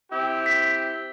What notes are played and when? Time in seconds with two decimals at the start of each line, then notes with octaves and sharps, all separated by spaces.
0.12 C4 E4 G4
0.46 B6